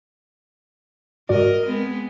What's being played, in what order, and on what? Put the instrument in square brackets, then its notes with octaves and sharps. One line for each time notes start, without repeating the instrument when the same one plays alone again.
[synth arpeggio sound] G#2 F#4 D5 [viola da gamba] A#4 D#5
[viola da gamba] G#3 B3 C4